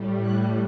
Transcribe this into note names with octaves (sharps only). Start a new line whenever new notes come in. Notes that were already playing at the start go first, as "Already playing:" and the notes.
Already playing: A2 G3
F#6